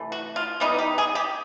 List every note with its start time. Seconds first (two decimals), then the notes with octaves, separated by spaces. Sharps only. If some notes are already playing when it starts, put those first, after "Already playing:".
Already playing: C3 E3 A3
0.12 F#4
0.36 F4
0.60 E3 G3 B3 D#4
0.79 G4
0.98 G#4
1.15 G4